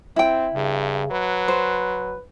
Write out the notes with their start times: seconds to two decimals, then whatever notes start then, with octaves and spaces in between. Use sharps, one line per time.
0.16 C4 E4 G5
0.55 G2 C#3
1.11 F#3 B4
1.48 C5